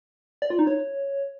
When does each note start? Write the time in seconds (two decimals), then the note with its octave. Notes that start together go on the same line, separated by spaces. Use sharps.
0.42 D5
0.50 F4
0.59 D#4
0.67 C#5